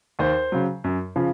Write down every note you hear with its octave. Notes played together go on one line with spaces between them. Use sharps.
D#2 C5
C#3 F#3
F#2
C#3 F3